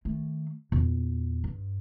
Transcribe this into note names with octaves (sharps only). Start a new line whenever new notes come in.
D#3 A3
E2 A#2
G2